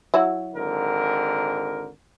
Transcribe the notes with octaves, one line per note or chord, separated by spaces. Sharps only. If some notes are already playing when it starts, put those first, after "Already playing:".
F#3 E4 F#4
G#1 D3 A#4